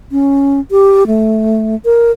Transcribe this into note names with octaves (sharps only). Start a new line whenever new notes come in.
C#4
G4
A3
A#4